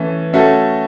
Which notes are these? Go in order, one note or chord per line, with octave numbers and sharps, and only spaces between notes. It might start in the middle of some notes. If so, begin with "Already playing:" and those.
Already playing: E3 A3 C#4
A3 C#4 F#4 A4